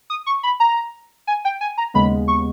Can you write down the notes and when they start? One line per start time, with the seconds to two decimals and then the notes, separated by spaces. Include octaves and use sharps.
0.10 D#6
0.26 C#6
0.43 B5
0.60 A#5
1.27 G#5
1.45 G5
1.61 G#5
1.78 A#5
1.94 D#2 C#3 G#3 B3 B5
2.28 C#6